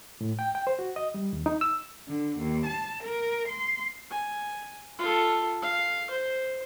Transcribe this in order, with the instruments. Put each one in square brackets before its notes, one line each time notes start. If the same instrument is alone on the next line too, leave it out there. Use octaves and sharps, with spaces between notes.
[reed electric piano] A2
G5
G5
C5
F#4
D#5
G3
D#2
D#4
E6
[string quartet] D3
D#2
A5
A#4
C6
[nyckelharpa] G#5
F4 A4
F5
C5